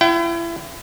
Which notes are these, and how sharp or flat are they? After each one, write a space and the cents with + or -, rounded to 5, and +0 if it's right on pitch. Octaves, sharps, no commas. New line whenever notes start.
E4 +35 G5 -40